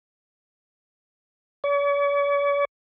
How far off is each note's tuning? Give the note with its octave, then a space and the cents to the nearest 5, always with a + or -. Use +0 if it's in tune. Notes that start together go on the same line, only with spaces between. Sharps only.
C#5 +45